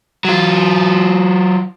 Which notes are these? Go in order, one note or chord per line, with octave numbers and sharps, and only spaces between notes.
F#3 F4